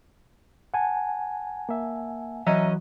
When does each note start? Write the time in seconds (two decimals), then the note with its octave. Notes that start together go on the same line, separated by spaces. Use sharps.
0.74 F#5 G#5 A5
1.69 A#3 E5
2.47 E3 F#3 C#4 C#5 D#5 E5 A#5